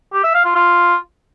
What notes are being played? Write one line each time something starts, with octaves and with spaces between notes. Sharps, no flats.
G4
E5
F5
F4
F4